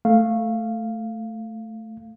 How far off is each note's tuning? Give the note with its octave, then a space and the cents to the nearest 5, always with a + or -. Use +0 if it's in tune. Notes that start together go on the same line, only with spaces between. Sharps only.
A3 +0 F5 +0